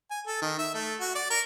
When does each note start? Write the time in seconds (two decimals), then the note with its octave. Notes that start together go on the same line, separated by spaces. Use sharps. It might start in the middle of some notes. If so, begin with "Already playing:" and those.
0.11 G#5
0.27 A4
0.42 D#3
0.59 E5
0.74 A3
1.00 F#4
1.15 D5
1.30 A#4